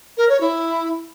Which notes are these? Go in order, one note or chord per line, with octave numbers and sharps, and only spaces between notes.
A#4
C#5
E4